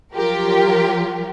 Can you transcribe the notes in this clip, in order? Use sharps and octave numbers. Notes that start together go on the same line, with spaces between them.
F3 F#3 F4 G4 A#4